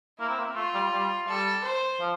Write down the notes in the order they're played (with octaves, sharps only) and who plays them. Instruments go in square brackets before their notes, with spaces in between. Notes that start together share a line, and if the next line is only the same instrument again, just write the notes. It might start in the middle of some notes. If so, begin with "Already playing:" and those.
[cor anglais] A#3 [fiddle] E4
[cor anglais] C4
A#3
[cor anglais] A3 [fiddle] F4
[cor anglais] G3
G3
[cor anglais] G3 [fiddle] A4
[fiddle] C5
[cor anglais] F3